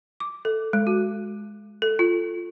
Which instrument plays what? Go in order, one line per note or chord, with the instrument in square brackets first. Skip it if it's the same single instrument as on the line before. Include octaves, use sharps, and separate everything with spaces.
[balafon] D6
A4
G#3
F#4
A4
F4